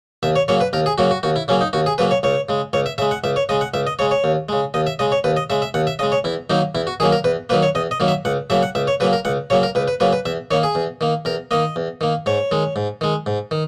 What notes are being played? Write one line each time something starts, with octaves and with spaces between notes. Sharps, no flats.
D#2 E5
C#5
C#3 F#3 A#3 C#5
B4
D#2 A#4
G#4
C#3 F#3 A#3 F#4
F#4
D#2 F#4
E4
C#3 F#3 A#3 C#4
D#4
D#2 F#4
G#4
C#3 F#3 A#3 B4
C#5
C#2 C#5
C#3 G#3
C#2 C#5
E5
C#3 G#3 E5
F#5
C#2 E5
C#5
C#3 G#3 D#5
F#5
C#2 E5
D#5
C#3 G#3 C#5
C#5
D#2
C#3 G#3
D#2 D#5
E5
C#3 G#3 D#5
C#5
D#2 B4
D#5
C#3 G#3 E5
E5
D#2 F#5
E5
C#3 G#3 D#5
C#5
E2 E4
D#3 F#3 A#3 D#4
E2 E4
F#4
D#3 F#3 A#3 G#4
A#4
E2 B4
D#3 F#3 A#3 B4
C#5
E2 D#5
D#5
D#3 F#3 A#3
E5
C#2 F#5
C#3 F#3 A#3 E5
F#5
C#2 E5
C#5
C#3 F#3 A#3 B4
A#4
C#2 F#5
C#3 F#3 A#3 C#5
A#4
C#2 B4
B4
C#3 F#3 A#3 B4
B4
E2 E5
D#3 A#3 C#5
G#4
E2
D#3 A#3
E2 A#4
D#3 A#3 D#5
E2
D#3 A#3
G#2 C#5
D#3 G#3
G#2
D#3 G#3
G#2
D#3